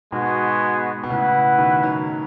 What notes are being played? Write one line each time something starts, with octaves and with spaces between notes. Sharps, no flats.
G#2 B2 G#3 B3 F#4
B2
A2 C#3 E4 B4 F#5
B2 D#3
D#3 F#3